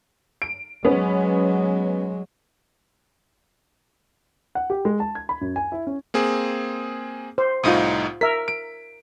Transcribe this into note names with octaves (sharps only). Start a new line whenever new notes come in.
D7
F#3 G#3 B3 C#4
F#5
G4
G#3
A5
G#6
B5
F#2
G#5
E4
C#4
A#3 C4 G#4
C5
C2 A2 D#4 F4 D#6
A#4 E5 B6
D7